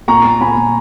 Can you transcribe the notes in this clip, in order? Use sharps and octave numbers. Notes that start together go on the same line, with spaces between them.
A#2 A#5 C#6
A#2
A#2 G#5 B5
A#2